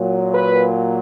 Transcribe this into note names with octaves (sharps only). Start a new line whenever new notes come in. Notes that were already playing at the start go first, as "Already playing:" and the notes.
Already playing: A#2 F#3
B4